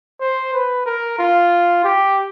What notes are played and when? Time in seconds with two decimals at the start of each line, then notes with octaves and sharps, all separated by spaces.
0.20 C5
0.53 B4
0.86 A#4
1.19 F4
1.84 G4